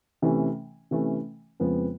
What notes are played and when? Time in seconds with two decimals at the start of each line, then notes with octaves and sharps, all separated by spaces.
0.22 C3 E3 A3 C#4
0.91 C3 E3 A3 C#4
1.60 F2 C#3 F3 G#3 B3